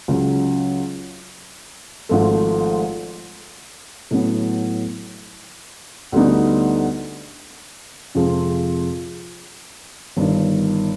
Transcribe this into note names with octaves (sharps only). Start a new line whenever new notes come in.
C#2 C#3 F#3
G#1 G#2 F3 A3
A2 F#3 B3
D2 D3 G3 B3 D#4
F2 C3 F3 G#3 C4
G1 G2 D#3